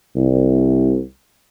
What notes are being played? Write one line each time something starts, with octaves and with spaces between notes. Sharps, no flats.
C2